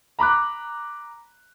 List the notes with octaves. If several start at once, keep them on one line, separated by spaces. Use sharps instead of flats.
A#5 B5 D6 F#6